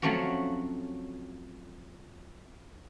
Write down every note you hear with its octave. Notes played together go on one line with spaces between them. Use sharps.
F3 F#3 A3 C4 C#4 F#4